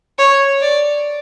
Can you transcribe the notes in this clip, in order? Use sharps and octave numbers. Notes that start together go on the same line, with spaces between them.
C#5
D5